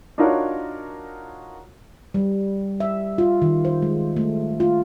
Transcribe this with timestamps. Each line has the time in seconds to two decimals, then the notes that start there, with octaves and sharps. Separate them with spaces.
0.18 D4 D#4 F4 F#4 A#4 C#5
2.14 G3
2.80 E5
3.18 F4
3.42 D#3
3.65 C5
3.82 G#3
4.17 A3
4.60 F4